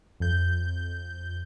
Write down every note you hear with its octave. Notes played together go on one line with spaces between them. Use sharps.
F2 G6